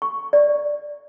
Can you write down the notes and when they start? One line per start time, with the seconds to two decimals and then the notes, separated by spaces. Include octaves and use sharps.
0.02 C#6
0.33 D5